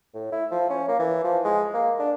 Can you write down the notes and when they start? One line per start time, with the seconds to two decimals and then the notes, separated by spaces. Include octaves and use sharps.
0.14 A2
0.32 E4
0.51 F3
0.70 C#4
0.88 A#3
0.99 E3
1.24 F3
1.45 G#3
1.74 A#3
1.99 D4